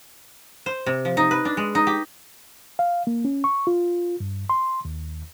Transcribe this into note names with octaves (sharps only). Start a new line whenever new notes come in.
C5
C3
F3
D#4
B4
D4
G#3
D#4
G4
F5
A#3
C#4
C#6
F4
G2
C6
D#2